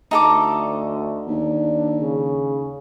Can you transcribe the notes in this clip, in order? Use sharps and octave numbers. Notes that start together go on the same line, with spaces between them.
D2 D#4 A4 D6
D#2 D4
C#3